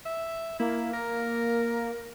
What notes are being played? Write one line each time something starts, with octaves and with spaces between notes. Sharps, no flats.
E5
A#3 E4
A#4